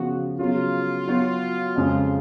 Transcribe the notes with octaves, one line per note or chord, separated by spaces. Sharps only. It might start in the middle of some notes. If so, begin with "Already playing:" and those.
Already playing: C#3 F3 B3 F#4
C#3 F#3 B3 F4
F#3 B3 F#4 C#5
F2 C#3 F3 G#3